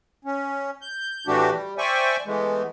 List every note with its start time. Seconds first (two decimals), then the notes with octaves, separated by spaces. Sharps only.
0.25 C#4
0.81 G6
1.27 A2 E3 A3 D4 F#4 G4
1.51 G3
1.78 C5 D5 E5 G5 G#5 C#6
2.26 E3 G#3 A3 B3